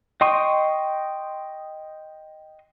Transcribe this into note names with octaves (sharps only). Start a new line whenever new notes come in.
D#5 G5 C6 C#6 D#6